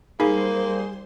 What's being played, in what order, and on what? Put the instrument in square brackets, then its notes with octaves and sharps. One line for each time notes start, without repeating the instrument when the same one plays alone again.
[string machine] G3 C5 C6 [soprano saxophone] A#3 [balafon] D#4 [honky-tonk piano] G#4